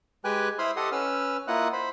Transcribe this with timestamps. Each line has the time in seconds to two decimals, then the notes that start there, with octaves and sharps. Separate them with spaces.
0.24 G#3 G4 B4 G5 G#5 F#6
0.59 E4 C5 B5 C6 D#6 F6
0.76 G4 A4 D#5 F#5 C6 D#6
0.92 C#4 B4 E6 F6
1.48 A#3 E4 F4 D#5 F#5 F#6
1.73 C5 B5